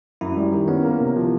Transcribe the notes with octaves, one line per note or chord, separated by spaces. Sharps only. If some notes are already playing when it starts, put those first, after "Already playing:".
F#2 E4
G3
D#3
B3 C#4
A#3
C3
F3